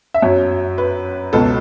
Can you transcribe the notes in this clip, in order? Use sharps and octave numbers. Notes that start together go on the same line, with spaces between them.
E5
F#2 F#3 C#5
B4
C#2 B2 F#3 A4